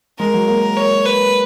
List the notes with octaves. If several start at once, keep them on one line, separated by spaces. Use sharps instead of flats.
G#3 A#4
F#3
A#3
C#5
B4